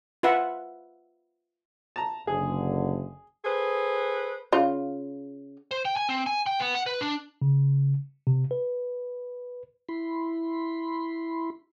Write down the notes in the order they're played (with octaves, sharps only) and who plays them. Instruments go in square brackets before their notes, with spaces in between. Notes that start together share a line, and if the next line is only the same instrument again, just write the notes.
[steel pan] F4 B4 E5 F#5
[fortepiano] A5 A#5
[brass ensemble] F#1 D3 [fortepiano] G#4
[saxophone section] G#4 A4 B4 C5
[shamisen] C#3 F4
[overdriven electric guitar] C5
G5
G#5
C4
G#5
G5
B3
F#5
B4
D4
[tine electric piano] C#3
C3
B4
[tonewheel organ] E4 B5 C6